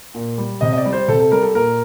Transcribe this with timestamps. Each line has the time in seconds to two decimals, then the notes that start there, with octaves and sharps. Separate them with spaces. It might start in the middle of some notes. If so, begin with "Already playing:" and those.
0.15 A#2
0.38 G3
0.61 C3 D#5
0.73 D#5
0.78 D5
0.85 G3
0.93 C5
1.08 C3 A4
1.20 A4
1.31 G3 A#4
1.43 A4
1.55 A#2 A#4